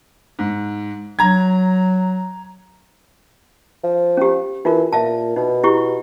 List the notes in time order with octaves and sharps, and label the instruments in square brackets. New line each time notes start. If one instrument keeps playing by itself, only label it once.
[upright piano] G#2
[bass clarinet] F#3 [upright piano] A#5 G#6
[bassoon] F3
[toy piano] C#4 G4
[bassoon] E3 [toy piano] D#4 F4 A#4
[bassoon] A#2 [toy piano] E5 F5 A5
[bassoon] B2 [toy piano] D#4
[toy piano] E4 G4 C#6